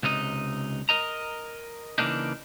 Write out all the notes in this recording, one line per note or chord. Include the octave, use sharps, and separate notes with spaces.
C#2 C3 D#4 D#5
A#4 D#5 A#5
C#3 E3 A3 A#3 D4 D#4